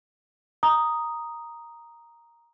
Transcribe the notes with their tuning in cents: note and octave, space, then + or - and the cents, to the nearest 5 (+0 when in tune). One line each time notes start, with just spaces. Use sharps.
A#5 +0 D#6 +0